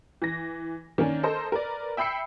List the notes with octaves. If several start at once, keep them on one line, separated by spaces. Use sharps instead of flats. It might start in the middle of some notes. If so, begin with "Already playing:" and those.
E3 A#6
D#3 A#3 C#4 D4
A4 A#4 C5 D#5
A#4 B4 D5
E5 G5 B5 E6 C7 C#7